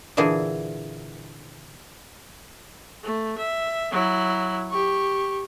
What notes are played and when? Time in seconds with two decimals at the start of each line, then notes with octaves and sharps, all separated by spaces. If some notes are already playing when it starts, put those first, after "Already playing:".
0.17 A#2 D3 E3 G#4
3.03 A3
3.38 E5
3.92 F#3 E4
4.71 G4 C#6